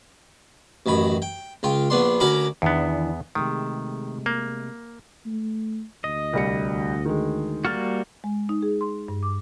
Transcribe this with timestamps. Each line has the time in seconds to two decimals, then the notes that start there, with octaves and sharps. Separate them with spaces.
0.86 A1 F#2 D#3 B5
1.22 G5
1.63 C#2 F4 G5
1.90 A#1 B3 D4 C6
2.20 D2 C#4 F#4 A#4 B5 D6
2.62 E2 D#3 E3 B3 D4
3.35 C3 D#3 G#3 A3
4.26 A#3
5.26 A3
6.04 D2 D#5
6.33 C2 G3 C#7
7.05 D#3 G#3
7.65 G3 A#3 F#4 F6 A6
8.24 G#3
8.49 D#4
8.62 G#4
8.81 C6
9.08 G2
9.23 D6